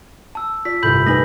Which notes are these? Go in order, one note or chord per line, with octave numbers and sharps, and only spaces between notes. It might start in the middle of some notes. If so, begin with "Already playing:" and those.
A5 E6
F4 D5 B6
G1 C2 A2 B5 G6 F#7
A3 D#4 B4 G#5 D#6 A#6 F#7